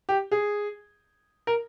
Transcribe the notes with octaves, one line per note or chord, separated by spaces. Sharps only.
G4
G#4
A#4